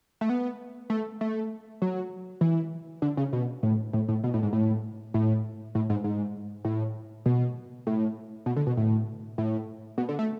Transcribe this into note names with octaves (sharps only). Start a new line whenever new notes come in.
A3
B3
A3
A3
F#3
E3
D3
C#3
B2
A2
A2
A2
B2
A2
G#2
A2
A2
A2
G#2
G#2
A2
B2
A2
B2
D3
B2
A2
A2
B2
D3
A3